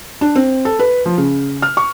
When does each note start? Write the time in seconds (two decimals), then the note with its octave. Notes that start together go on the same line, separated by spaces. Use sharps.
0.21 D4
0.35 C4
0.65 A4
0.79 B4
1.06 F3
1.18 C#3
1.62 F6
1.77 C#6